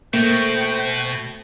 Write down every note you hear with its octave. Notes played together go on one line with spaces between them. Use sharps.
B2 A3 A#3 C5 G5